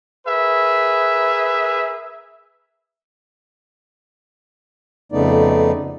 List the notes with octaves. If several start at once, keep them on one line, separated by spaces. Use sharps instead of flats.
G#4 A#4 B4 E5
F2 C#3 A3 B3 D#4 D5